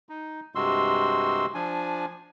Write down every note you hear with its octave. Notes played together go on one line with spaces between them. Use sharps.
D#4
G2 C3 G#3 F#4 C6 E6
F3 D4 G#5